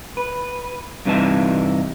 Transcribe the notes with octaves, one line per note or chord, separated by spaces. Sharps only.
B4
G2 C3 E3 D#4 A5